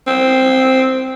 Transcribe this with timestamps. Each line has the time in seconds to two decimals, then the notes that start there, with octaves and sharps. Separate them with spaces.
0.07 C4